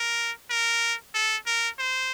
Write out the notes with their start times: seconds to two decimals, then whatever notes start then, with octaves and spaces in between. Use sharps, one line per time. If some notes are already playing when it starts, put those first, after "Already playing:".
Already playing: A#4
0.50 A#4
1.14 A4
1.46 A#4
1.79 C5